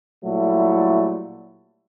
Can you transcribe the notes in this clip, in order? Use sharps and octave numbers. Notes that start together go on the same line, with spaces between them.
A#2 F#3 G3 A3 E4